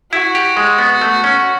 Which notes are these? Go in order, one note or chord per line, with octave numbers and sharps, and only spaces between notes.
E4 F#4
G4
G#3
B3
A3
C#4